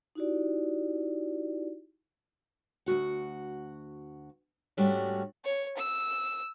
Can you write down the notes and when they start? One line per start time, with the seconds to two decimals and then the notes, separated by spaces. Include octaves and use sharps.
0.15 D#4 E4 F#4 G4 D5
2.86 D2 C3 F#4 F#5
4.77 G#2 G3 A3 C#4 D4 F#4
5.45 C#5
5.77 E6